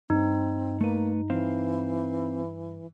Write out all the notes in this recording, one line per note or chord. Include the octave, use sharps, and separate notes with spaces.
G2 C4 D#4
A3 A#3 B4
E3 C4 C5 F5